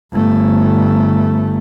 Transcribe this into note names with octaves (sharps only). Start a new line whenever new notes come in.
G1 A3